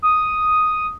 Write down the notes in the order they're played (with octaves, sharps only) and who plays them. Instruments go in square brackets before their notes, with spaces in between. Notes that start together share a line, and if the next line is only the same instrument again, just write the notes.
[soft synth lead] D#6